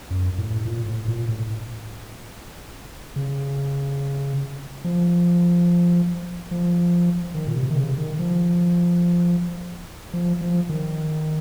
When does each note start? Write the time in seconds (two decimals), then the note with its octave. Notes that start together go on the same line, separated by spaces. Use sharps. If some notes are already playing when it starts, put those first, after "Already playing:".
0.10 F#2
0.38 A2
0.65 A#2
0.86 A2
1.08 A#2
1.28 A2
3.16 C#3
4.84 F3
6.51 F3
7.34 D#3
7.47 A#2
7.55 C3
7.71 D#3
7.76 C#3
7.98 D#3
8.19 F3
10.13 F3
10.41 F3
10.69 D#3